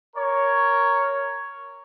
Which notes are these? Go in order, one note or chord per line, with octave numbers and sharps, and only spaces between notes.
A#4 C#5